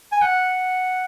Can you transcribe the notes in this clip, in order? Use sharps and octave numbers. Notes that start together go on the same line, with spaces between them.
G#5
F#5